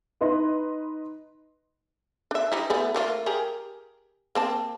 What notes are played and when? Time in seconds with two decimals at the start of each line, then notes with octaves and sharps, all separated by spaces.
0.21 D#4 B4 D#5 C6
2.31 D4 E5
2.52 G3 D#4 E4
2.70 A3 B3 G#4
2.94 A3 A#3 F4
3.26 G4 G#4 A#4
4.35 A#3 C4 A5